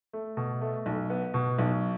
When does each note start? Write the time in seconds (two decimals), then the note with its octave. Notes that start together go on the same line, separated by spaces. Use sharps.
0.13 A3
0.37 B2
0.61 A3
0.86 B1
1.10 B3
1.34 B2
1.59 B1